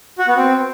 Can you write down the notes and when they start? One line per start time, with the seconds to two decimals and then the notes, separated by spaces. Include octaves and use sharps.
0.19 F#4
0.27 B3
0.36 C4